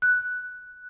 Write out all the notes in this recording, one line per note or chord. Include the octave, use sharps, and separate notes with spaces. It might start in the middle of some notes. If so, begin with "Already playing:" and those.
F#6